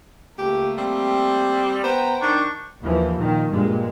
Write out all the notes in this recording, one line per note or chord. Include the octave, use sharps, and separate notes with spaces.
C#2 A3 A#3 G4
G3 C4
B3 C5 G5 A#5
D#3 D4 C#6 G6
D#2 E3 F3
A#2 D#3
G2 A#2 G#3